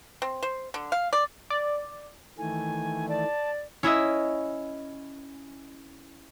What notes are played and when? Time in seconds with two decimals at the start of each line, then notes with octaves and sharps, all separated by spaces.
0.22 C4
0.43 C5
0.74 D3
0.92 F5
1.13 D5
1.50 D5
2.38 D#3 E3 A3 G#5
3.09 D5 A5
3.83 C#4 E4 D#5 E5